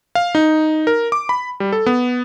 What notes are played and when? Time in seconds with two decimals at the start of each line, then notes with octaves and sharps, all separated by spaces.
0.15 F5
0.35 D#4
0.87 A#4
1.12 D6
1.29 B5
1.60 G3
1.72 A4
1.86 B3